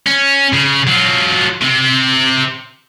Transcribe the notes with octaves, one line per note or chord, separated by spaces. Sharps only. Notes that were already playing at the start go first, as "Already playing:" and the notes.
C#4
C#3
F#3 F4
C3 C4